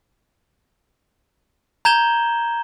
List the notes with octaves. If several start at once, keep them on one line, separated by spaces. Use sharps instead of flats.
A#5 G6 G#6 E7 G7